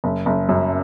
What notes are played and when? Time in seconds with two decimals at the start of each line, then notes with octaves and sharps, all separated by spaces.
0.04 F#1
0.26 F#1
0.49 F#2